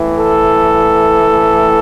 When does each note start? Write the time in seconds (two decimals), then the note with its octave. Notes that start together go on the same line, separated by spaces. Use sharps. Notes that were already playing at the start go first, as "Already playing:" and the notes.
Already playing: A2 E3
0.18 A4